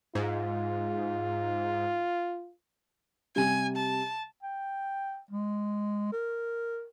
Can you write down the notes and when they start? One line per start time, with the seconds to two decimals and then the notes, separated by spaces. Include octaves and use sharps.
0.15 G#2 F4
3.36 C3 G3 G#5
3.76 A5
4.43 G5
5.31 G#3
6.12 A#4